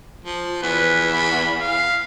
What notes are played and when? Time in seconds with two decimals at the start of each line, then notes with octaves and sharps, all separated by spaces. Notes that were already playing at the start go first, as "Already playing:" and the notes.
0.25 F3
0.63 E2 B4
1.14 B5
1.61 F5